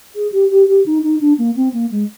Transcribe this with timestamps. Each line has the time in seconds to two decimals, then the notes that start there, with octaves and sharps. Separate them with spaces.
0.15 G#4
0.32 G4
0.50 G4
0.68 G4
0.86 D#4
1.03 D#4
1.21 D4
1.39 A#3
1.56 C4
1.74 A#3
1.91 G#3